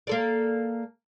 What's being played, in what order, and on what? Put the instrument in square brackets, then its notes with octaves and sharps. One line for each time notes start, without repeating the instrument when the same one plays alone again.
[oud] A#3 A4 D5